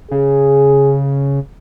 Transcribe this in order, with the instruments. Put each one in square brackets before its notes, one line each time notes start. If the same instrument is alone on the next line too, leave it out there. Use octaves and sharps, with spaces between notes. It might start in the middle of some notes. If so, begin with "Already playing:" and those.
[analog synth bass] C#3 [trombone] G#4